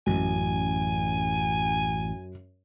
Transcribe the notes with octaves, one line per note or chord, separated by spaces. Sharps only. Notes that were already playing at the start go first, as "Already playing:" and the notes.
A1 F#2 G#5